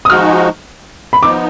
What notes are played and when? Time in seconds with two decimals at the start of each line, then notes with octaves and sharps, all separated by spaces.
0.05 D#6
0.10 F3 G#3 D#4 F#4 F6
1.13 B5
1.23 F3 B3 D#4 D6